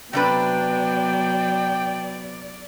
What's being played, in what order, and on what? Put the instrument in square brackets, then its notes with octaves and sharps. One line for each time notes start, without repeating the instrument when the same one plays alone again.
[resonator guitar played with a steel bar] C3 D4 B4 [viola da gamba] F#3 B3 [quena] D5 [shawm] G5